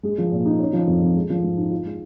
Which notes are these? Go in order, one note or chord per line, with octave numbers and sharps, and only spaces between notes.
G#3
F3
A#2
D#4
C#4
F3
F2
F2
G#3
F3
G#2
D#4
F4
G#3